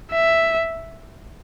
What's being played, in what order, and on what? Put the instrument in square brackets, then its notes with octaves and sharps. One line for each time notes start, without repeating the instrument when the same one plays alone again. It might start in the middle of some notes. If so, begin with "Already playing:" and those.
[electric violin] E5